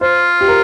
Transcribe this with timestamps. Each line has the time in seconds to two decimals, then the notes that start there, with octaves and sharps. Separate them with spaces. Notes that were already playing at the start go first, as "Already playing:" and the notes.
0.01 F4 C5
0.41 G4
0.48 A#4